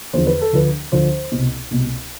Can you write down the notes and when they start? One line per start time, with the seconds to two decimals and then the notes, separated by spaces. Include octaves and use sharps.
0.13 E2 D3 F3 C5
0.27 B4
0.41 A4
0.53 D2 D3 F3 B4
0.92 D2 D3 F3 C5
1.32 C2 B2
1.71 C2 B2